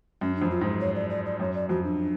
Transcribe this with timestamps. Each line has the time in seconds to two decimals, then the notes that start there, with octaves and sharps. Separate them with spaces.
0.21 F#2 C#4
0.36 D4
0.42 F2
0.51 F4
0.61 G#2
0.81 C#5
0.96 D5
1.10 D5
1.26 D5
1.40 F#2 C#5
1.55 D5
1.69 F2 F#4
1.84 D4